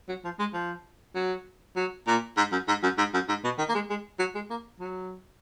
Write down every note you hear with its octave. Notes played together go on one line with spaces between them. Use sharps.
F#3
F3
G#3
F3
F#3
F#3
A#2
G#2
F#2
G#2
F#2
G#2
F#2
G#2
B2
D#3
A#3
G#3
G#3
F#3
G#3
A#3
F#3